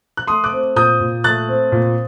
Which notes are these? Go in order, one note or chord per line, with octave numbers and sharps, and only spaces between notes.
F#6
A3 C6 D#6
D6 F#6
C4
A#2 D#6 G6
A#2
A3 F#6 A6
C4
A#2